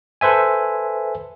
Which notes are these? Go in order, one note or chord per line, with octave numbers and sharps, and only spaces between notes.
A4 B4 C5 E5 G#5